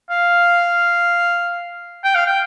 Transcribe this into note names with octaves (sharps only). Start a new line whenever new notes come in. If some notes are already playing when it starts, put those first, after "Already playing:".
F5
G5
F5
G5